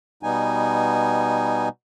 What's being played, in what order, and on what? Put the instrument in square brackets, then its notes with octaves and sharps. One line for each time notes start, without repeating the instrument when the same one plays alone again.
[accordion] B2 G3 B3 D#4 G#5